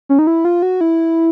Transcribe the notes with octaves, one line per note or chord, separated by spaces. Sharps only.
C#4
D#4
E4
F4
F#4
E4